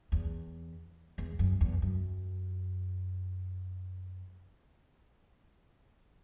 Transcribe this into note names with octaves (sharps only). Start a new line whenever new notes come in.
E2
E2
F#2
E2
F#2